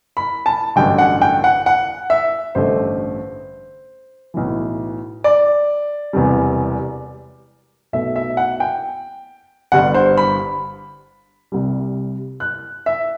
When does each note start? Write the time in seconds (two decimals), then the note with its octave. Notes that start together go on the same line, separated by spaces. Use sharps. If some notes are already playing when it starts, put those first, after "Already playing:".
0.17 B5
0.46 A5
0.76 A1 G2 D3 F#3 A3 G5
0.98 F#5
1.21 G5
1.44 F#5
1.66 F#5
2.10 E5
2.55 A1 G2 D3 A3 C5
4.34 B1 A2 E3
5.24 D5
6.13 E1 E2 C3 E3 G3
7.93 B1 B2 A3 E5
8.16 E5
8.37 F#5
8.60 G5
9.72 G1 G2 D3 G3 F#5
9.94 C5
10.17 B5
11.52 C2 C3 G3
12.40 F#6
12.86 E5